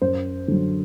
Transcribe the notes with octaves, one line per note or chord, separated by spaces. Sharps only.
F#2 C5
D3 F#3